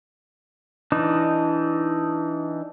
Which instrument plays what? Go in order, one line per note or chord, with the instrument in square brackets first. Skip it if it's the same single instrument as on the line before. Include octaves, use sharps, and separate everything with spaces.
[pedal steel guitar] E3 D4 D#4